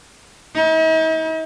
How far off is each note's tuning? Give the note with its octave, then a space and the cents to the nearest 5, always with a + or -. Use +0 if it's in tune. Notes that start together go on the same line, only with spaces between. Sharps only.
D#4 +45